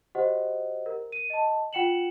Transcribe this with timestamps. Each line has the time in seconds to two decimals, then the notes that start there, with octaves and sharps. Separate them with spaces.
0.15 F#4 G4 C5 D#5 F#5
0.86 A#4
1.12 D#7
1.30 D#5 A5
1.73 F4 F#5 G5 C#7 E7 F#7